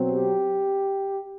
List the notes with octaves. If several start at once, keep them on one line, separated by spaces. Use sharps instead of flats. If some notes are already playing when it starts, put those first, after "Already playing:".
Already playing: B2 F#3 C4
G4